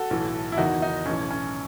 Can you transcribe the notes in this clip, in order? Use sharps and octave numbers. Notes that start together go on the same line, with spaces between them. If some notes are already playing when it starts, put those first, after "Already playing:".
Already playing: F#4 A4
B1 A2 E3
E4
F#1 E2 D#3 D#4 F#4
D#4
B1 A2 E3 C#4
C#4